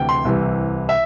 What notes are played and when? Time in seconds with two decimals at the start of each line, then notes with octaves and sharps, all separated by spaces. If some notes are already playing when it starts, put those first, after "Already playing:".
Already playing: D2 C3 E3 G5
0.09 C6
0.25 C2 C3 E3
0.89 E5